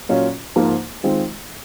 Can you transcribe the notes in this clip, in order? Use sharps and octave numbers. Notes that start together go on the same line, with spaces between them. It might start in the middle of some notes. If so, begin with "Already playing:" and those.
A#2 F#3 C#4 F4
G#2 F3 A#3
D#3 G#3 C4 F4